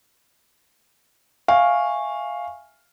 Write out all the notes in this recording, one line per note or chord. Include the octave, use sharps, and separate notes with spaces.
E5 F5 G#5 C#6